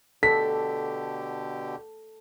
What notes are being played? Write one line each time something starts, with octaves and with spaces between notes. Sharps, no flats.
B2 D3 G4 A4 B6